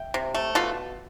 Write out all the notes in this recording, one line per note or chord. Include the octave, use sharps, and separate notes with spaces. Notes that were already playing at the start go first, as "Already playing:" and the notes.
Already playing: E5 G5
C3
A3
B2 F4 A4